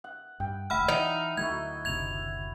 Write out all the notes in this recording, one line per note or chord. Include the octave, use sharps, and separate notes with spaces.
F#5
G2 G5
F1 D2 A3 E5 F#5 B5 F6
E3 F#3 D#4 A#5
D2 F#3 A3 E4 F#4 G#6
F#1 D2 C3 G#6 F7